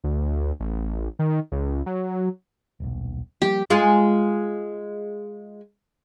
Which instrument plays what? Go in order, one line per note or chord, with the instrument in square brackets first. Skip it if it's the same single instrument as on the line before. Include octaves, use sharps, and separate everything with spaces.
[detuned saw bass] D2
A1
D#3
C#2
F#3
[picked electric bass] D#1 B1
[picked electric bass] F3 G3 A#3 [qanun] G4
[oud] G#3 F4 G#4